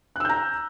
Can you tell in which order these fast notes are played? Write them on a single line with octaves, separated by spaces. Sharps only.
F#6 E6 G6 A#5